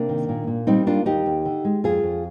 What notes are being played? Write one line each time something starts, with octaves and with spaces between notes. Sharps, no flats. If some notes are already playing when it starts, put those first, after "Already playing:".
Already playing: C3 A#3 D4
D#3
A#2
A#2
G3 C4 D#4
A#3 D4 F4
D#2 D#4 G4
D#2
D3
G#3
F2 F4 G#4
F2